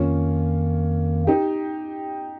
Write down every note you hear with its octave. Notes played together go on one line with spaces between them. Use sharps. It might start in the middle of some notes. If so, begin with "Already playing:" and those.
Already playing: F2 D#3 A#3 C#4 F4
D#4 G4